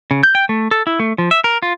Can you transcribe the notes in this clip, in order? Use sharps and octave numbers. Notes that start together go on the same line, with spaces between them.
C#3
G6
G5
A3
A4
E4
A3
F3
E5
A#4
F4